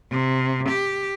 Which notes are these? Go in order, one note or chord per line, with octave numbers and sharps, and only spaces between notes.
C3
G4